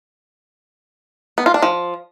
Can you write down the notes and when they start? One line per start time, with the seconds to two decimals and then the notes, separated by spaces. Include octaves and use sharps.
1.38 B3
1.46 F4
1.54 D4
1.63 F3